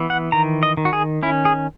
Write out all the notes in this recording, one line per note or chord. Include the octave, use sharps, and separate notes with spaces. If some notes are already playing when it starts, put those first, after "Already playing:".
Already playing: E3 B3
F#5
D#3 A#5
D#5
D#3
F#4
G#4
C#4 E4
G#4